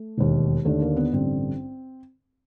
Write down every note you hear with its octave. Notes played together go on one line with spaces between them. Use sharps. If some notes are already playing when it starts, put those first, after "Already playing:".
Already playing: A3
E1 D#2 D#3
D#2 D3 A3
A#3
B3
A1 G2 D3 C4